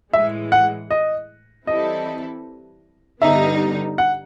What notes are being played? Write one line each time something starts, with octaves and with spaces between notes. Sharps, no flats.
A2 E3 G#3 E5
F#5
D#5
E3 G3 C4 E4 A4 D#5
G2 D3 G3 B3 D#4 E5
F#5